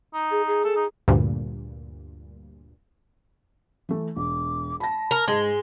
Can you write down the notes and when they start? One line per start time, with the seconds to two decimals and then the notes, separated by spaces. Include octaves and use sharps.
0.14 D#4
0.31 G#4
0.47 G#4
0.64 A4
0.76 D#4
1.08 D2 G2 A#2
3.89 E3 A3
4.16 E1 D6
4.80 A5 B5 A#6
5.11 A#4
5.28 G#2 G#3 A#6